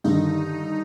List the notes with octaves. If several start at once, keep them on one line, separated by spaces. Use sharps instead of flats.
G2 D3 D#3 D#4